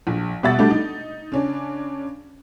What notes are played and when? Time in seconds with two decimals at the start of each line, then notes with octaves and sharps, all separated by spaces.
0.07 A#1
0.43 B2 G3 E5 F#5 A6
0.58 G3 A3 D4 F#4
0.71 D#4
1.32 C#3 C#4 D4